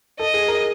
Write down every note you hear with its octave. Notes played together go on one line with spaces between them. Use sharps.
A4 D#5
G#4
A#4